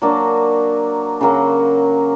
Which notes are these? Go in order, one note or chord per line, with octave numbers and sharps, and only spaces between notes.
F#3 A#3 D4 F#4
C#3 F#3 A#3